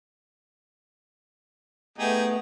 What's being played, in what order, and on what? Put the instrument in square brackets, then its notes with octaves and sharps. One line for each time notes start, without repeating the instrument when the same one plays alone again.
[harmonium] A3 B3 [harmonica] D#4 G4 G#4